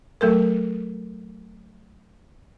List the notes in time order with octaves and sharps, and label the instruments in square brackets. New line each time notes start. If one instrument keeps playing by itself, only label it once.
[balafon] F#3 A3 A4 A#4